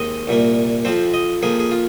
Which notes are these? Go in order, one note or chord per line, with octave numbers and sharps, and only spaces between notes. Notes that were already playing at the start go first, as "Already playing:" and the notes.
Already playing: D#2 D#3 G#3 C4 D#5
C2 A#2 A#3
F2 F3 C4 C5
D#5
F2 F3 A#3 G#4
G#4
F4